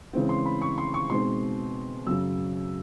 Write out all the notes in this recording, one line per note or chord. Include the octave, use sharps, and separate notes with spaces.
C#3 E3 G#3 C4
C6
B5
C#6
C6
C#6
B2 G#3 C4 D#4 C6
F#2 C#3 F#3 E6